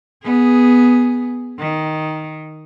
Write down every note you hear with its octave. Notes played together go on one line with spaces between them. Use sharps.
B3 G#4
D#3